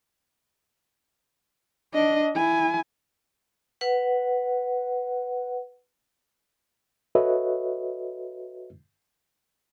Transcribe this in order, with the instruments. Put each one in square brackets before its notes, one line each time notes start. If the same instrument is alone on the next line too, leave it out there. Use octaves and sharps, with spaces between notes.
[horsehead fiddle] D4 D#5
E4 G#5
[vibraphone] B4 F#5
[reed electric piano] F#4 A4 B4 C#5 D#5 E5